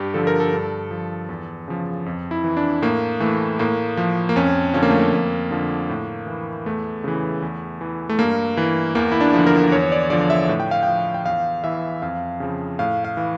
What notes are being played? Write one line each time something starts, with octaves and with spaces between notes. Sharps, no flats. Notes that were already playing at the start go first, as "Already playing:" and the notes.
Already playing: G2 G4
D3 F3 A4
A#4
A4
G2
F3
E2
C#3 F3
F2
E4
E3
D4
A2 A#3
E3 A3
A2 A#3
F3
A#3
F2 C#4
D3 F3 C#4
A#3
A3
A#3
F2
D3 F3
A2
E3
E2 A3
C#3 E3
E2
E3
A3
G2 A#3
E3
E2 A#3
E4
D4
D3 F3
A#4
E2 C#5
D5
D3 F3 D5
E5
A2
G5
F5
F3 G5
G5
E2 F5
E3 E5
F2 F5
C#3 F3
A2 F5
F5
E3